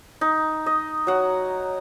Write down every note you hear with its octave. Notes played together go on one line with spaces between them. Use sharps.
D#4
D#5
F#3 F#5